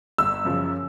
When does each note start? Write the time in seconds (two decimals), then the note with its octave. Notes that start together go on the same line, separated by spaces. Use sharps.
0.18 G1 E6
0.45 F#2 C#3 F3